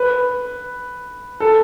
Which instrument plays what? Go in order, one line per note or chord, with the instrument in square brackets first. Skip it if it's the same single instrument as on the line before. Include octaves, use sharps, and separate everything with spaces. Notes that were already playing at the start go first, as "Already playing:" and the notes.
Already playing: [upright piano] B4
A4